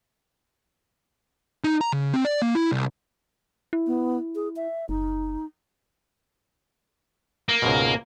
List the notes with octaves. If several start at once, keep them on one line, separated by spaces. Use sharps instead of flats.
D#4
A#5
C#3
C4
D5
A#3
E4
C2
E4
B3
G#4
E5
F#1 D#4
A#3
C#2 G#2 B2